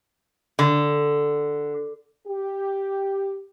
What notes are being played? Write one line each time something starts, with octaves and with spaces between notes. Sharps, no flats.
D3
G4